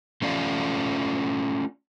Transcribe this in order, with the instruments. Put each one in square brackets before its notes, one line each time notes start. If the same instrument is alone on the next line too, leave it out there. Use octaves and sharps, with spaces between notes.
[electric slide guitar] A3 C#4 F4 D5 F5